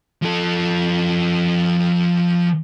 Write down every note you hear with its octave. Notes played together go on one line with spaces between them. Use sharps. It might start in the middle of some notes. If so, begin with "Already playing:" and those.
F3 A4